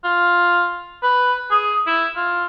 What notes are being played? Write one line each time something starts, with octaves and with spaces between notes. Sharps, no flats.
F4
B4
G#4
E4
F4